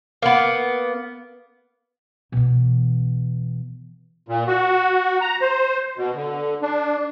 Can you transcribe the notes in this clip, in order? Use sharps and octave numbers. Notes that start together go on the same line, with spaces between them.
A#3 B3
B2 E3
A#2
F#4
A#5
C5
B2
D3
D4